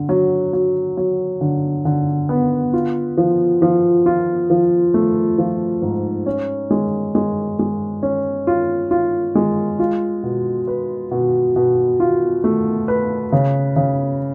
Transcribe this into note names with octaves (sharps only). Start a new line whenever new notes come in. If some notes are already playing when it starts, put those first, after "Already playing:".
Already playing: D3
F#3
F#3
F#3
D3
D3
B3
F4
F3
F3
F4
F3
A3
F3
G#2
C#4
G#3
G#3
G#3
C#4
F4
F4
G#3
F4
B2
B4
B2
B2
F4
A3
B4
C#3
C#3